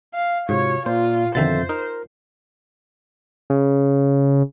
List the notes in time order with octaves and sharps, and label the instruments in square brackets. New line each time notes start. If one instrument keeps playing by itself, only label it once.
[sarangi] F5
[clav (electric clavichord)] G#2 [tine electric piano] C3 F4 F#4 [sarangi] C#5
[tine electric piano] A#2 [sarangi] F4 [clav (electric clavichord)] C5
[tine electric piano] F2 E5 A6 [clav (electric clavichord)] B2 D3 D#3 [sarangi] C5
[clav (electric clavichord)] D#4 [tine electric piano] A#4
[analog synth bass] C#3